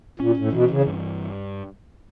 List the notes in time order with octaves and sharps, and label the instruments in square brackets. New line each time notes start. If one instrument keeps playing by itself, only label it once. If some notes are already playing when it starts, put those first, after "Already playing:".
[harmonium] A#2 [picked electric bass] C#4
[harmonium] A2
[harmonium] B2 [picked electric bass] E3
[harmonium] C#3
[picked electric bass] G2